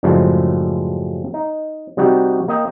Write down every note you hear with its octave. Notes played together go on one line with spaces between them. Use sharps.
F#2 A2 C#3 F3 G3 G#3
D#4
C3 G3 D#4 F#4 G4
A#3 D#5 G5